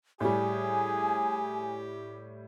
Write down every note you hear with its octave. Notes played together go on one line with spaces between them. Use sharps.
A2 G3 G4 G#4 G#5